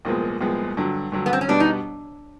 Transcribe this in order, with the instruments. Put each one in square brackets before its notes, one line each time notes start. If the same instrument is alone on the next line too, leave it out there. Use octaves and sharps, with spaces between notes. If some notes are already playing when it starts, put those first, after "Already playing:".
[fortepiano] C2 A#2 F3 G#3 B3
C2 A#2 F3 G#3 B3
G2 D3 F#3
G2 D3 F#3
[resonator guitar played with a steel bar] B3
C4
C#4
[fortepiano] B2 G3 B3 [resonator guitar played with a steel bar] D4
[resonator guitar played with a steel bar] D#4